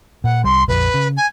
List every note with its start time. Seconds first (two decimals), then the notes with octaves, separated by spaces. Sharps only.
0.24 A#2 F#5
0.44 C2 G3 C6
0.68 A#1 F2 B4
0.94 C#3
1.17 G#5